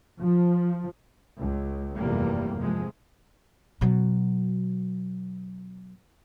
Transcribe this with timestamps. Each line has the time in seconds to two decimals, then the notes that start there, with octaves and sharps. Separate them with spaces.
0.22 F3
1.39 C#2
1.96 F1 E2 G2 C3 G3 A#3
2.57 C3 F3 G#3
3.81 B2 F#3